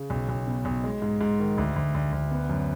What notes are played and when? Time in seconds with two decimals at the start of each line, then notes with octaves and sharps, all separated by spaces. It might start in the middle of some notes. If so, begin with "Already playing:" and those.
Already playing: C#3
0.10 B1
0.29 B1
0.47 B2
0.65 B1
0.84 G#3
1.02 G#2
1.21 G#2
1.40 D#3
1.58 D2
1.76 D2
1.95 D2
2.12 D2
2.31 B3
2.49 F#2